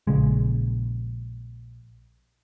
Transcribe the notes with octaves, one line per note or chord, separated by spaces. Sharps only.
A#1 C#3 G#3